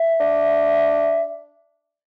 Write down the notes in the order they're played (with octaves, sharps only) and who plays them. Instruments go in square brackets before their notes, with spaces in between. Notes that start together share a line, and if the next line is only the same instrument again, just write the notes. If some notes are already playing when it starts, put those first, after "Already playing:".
Already playing: [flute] E5
[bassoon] D4